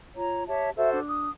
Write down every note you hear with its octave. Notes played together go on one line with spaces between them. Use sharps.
F4 C#5 A#5
G4 C#5 E5 A5
F#4 A4 C5 E5
D4
D#6